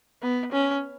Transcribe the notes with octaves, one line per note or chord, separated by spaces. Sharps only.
B3
C#4